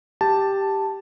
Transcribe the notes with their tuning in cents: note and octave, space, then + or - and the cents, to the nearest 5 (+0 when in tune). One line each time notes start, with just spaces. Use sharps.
G4 +0 A5 +0